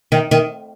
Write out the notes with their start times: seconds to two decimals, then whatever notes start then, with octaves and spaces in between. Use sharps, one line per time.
0.12 D#3
0.31 D#3